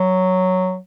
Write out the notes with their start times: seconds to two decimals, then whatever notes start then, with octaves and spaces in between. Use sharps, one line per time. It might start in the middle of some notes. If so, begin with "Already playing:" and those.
Already playing: F#3